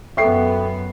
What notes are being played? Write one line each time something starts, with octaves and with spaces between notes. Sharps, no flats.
F#2 B3 A4 E5 G5 C#6 C7